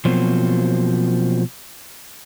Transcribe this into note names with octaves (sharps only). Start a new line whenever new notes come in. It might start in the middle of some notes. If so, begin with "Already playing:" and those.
B2 F3 F#3 A#3 C4